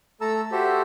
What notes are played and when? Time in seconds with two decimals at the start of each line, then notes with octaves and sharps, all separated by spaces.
0.21 A3 A4 A5 A#5 E6
0.52 F#4 G4 A4 C5 E5